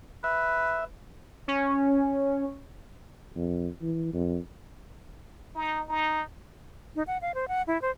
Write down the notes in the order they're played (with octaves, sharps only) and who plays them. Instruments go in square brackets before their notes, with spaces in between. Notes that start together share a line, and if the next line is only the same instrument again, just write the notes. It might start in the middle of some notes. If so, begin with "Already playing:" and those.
[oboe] B4 [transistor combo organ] E5
[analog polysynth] C#4
[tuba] F2
E3
F2
[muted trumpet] D#4
D#4
[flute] D#4
F#5
F5
C5
F#5
E4
C5